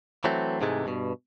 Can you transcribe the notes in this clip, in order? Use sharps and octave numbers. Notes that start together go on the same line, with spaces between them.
E3 F#3 A3 C4
G#2 C3 E3 G#3 A3
G2 B2